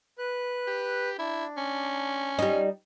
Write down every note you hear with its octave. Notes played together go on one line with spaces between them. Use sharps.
B4 F#6
G4
D4 E4
C#4
G3 D#4